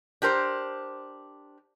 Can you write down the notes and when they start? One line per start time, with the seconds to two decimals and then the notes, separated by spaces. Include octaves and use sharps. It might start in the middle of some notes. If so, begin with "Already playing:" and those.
0.22 D4 G4 A#4 C5